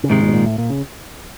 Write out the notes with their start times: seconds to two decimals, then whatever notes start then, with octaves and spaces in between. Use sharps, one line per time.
0.04 C#3
0.10 G#2 C3 D#3 G#3
0.22 A#2
0.28 B2
0.33 A#2
0.46 A2
0.58 A#2
0.70 C#3